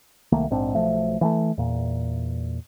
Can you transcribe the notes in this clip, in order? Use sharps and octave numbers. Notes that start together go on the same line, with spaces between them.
C2 D#3 A3 A#3
A#1 G#2 C4 D4
B1 F3 A3
E3 G#3 A3
E2 A#2